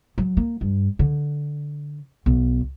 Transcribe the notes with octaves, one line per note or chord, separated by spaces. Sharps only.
F#3
A#3
G2
D3
B1